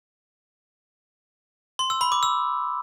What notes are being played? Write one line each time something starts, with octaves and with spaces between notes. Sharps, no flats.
C6
E6
B5
D6
E6